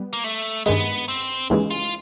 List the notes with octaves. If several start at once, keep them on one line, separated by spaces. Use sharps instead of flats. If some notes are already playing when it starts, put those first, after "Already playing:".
Already playing: G3 B3
A#3
A3
G2 D#3 G#3 B3
C4
D#2 C#3 E3 G#3
F4